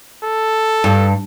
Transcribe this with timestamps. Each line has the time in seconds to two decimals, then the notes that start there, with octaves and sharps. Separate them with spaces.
0.24 A4
0.84 G2